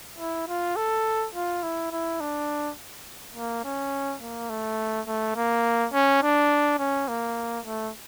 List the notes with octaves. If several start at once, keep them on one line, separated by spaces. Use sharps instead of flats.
E4
F4
A4
F4
E4
E4
D4
A#3
C#4
A#3
A3
A3
A#3
C#4
D4
C#4
A#3
A3